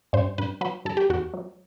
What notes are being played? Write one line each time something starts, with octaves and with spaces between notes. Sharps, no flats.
G2 C5
G2 B4
F#3 B4
G2 A4
G4
E2 F#4
F#3